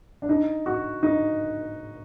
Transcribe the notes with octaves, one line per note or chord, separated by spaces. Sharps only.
D4
D#4
F#4
D#4